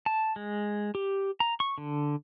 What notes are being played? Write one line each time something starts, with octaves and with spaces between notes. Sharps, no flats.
A5
G#3
G4
A#5
C#6
D3